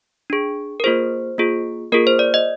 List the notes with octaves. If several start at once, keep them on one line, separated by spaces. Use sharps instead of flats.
D4 G#4
A#4
A#3 F4 G#4 C5
A#3 F4 G#4
A#3 F4 G#4 A#4
C5
D5
D#5